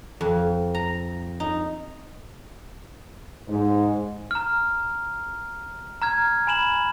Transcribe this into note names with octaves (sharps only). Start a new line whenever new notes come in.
F2
A#5
D#4
G#2
A#5 F6
A#5 F6 G#6
G#5 B5 E7 F#7